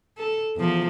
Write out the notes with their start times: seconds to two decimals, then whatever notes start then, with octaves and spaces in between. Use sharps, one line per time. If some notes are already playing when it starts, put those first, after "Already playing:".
0.17 A4
0.57 E2 F3